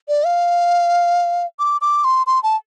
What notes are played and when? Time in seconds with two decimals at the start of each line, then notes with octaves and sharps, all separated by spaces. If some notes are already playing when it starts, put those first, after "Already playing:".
0.08 D5
0.26 F5
1.59 D6
1.81 D6
2.04 C6
2.27 C6
2.43 A5